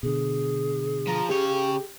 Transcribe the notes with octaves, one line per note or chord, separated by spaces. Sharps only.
B2 D3 G#4
F3 A#5
C#3 G4 C#5